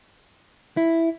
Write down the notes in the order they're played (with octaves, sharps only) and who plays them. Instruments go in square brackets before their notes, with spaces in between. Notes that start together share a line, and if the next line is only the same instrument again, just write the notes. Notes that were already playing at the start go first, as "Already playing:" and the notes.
[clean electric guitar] E4